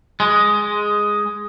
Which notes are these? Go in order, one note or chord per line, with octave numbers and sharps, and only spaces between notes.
G#3